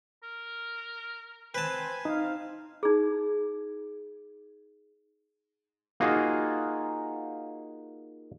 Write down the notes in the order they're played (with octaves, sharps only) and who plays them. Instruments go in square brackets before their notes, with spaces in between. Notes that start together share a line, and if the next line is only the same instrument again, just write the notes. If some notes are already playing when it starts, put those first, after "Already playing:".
[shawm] A#4
[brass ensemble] C4 C5 [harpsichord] B4 A5 [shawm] G#5
[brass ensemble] C4 F5 [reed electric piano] D#4
[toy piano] D#4 G#4
[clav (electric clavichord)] A#3 D#4 F4 F#4 G#4